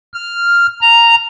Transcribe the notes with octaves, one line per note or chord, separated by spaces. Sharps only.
F6
A#5